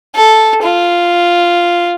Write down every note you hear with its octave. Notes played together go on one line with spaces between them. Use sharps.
A4
F4